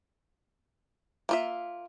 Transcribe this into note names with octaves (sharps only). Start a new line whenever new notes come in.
A#3 F4 E5